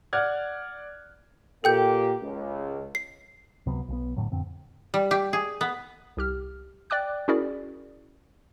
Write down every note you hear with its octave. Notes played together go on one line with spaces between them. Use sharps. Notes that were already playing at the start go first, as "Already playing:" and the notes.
D5 F#5 F6 F#6 G#6
A#2 A#3 G4 A4 G5 G6
C#2
C7
C#2 C3 F#3 B3
B1 F3 B3
E1 A2 D3 F#3
F2 D3 C4
G3
G4
G#4
B3
C2 G4 F6
D5 G5 D6 F#6
C#4 E4 F#4 G#4 A#4 D5